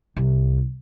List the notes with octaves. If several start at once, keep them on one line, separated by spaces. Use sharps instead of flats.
C2